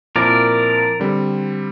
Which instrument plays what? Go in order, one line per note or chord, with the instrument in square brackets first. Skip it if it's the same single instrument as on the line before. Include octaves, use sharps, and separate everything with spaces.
[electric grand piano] A#2 F3 C4 E4 [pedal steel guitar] A#4 D5
[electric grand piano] D3 G3 C4